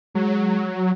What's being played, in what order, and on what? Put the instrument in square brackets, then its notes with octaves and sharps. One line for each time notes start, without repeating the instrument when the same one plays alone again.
[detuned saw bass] F#3 [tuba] G#3